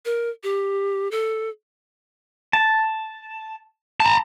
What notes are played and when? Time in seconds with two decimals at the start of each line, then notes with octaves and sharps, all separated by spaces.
0.05 A#4
0.43 G4
1.11 A4
2.53 A5
4.00 A5 A#5